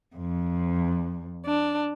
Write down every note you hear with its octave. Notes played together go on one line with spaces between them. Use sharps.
F2
D4